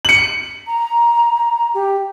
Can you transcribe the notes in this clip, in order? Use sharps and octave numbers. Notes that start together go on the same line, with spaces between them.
C#7 F#7
A#5
G4